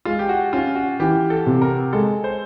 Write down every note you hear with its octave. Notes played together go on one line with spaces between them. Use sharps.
G#3 F4
G4
F#4
C#4 F4
F#4
E3 G4
A4
C3
A#4
G#3 A4
C5